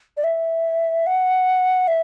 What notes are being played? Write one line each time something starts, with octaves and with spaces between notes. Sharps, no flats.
D5
E5
F#5
E5